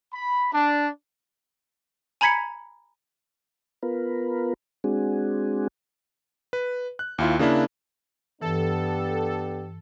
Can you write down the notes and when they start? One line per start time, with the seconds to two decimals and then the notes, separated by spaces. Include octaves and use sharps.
0.14 B5
0.53 D4
2.21 G#5 A#5 B5 G#6 B6 C#7
3.83 B3 F4 A#4 B4
4.84 G#3 C4 D4 F#4 G#4
6.53 B4
6.99 F#6
7.18 D#2 E4 F4
7.39 C#3 A#3 D4 E4
8.41 G2 E3 B3 D4 G4 A4